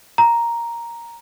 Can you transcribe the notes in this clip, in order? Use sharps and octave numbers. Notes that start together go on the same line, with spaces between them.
A#5